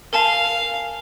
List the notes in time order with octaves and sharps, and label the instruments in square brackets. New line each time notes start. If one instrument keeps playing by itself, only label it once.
[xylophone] A#4 G#5 A5 [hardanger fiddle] F5